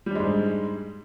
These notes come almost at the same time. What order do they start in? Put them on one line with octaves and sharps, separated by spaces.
G3 D4 G#3 G#2